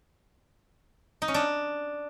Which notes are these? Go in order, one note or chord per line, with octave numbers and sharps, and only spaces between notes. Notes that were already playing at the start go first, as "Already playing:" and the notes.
D#4
C#4
D4